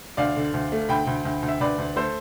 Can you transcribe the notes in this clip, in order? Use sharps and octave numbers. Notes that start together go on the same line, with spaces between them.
D2 D5 F5
D3
D2
A3
D2 G5 B5
D2
D2
D2
E5
D2 B4 D5
D2
A3 A4 C5